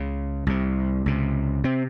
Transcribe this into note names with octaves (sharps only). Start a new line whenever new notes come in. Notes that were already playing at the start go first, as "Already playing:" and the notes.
Already playing: C#2 C#3
C2 C3
C#2 C3
C3 C4